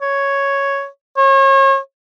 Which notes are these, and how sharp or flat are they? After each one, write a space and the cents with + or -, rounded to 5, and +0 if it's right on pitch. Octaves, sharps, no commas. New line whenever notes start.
C#5 +0
C#5 -35